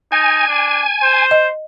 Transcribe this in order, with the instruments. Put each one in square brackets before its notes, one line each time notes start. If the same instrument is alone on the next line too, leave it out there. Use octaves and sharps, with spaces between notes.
[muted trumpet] D#4 [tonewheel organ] G#5
[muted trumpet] D4
C5
[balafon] D#5